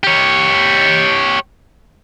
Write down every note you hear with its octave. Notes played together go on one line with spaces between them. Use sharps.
G4 C#5